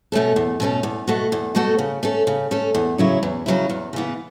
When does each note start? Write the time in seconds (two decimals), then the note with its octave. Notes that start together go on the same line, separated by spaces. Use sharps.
0.12 B2 A3 C#4 A4
0.36 E2
0.60 B2 A3 C#4 A4
0.83 E2
1.07 B2 A3 F#4 A4
1.32 E2
1.55 B2 A3 F#4 A4
1.79 C#3
2.03 A3 C#4 A4
2.27 C#3
2.51 A3 C#4 A4
2.75 E2
2.98 C#3 F#3 C#4 E4
3.23 E2
3.46 C#3 F#3 C#4 E4
3.69 E2
3.93 C#3 E3 B3